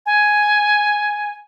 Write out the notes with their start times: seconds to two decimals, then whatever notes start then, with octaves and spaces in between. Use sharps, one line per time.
0.06 G#5